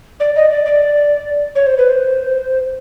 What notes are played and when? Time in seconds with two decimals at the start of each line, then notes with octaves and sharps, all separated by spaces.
0.20 D5
0.36 D#5
0.51 D5
0.66 D5
1.55 C#5
1.67 C5
1.78 B4
1.89 C5